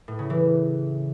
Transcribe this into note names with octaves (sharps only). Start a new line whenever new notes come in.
A2
C#3
E3